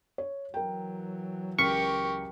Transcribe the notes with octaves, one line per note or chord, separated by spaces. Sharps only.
C#5
E3 F#3 A#4 G5
C#2 G4 A#4 C#6 F6 B6